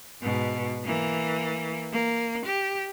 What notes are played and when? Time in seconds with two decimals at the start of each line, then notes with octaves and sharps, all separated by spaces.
0.22 G#2 B2
0.84 E3 A#3
1.92 A#3
2.46 G4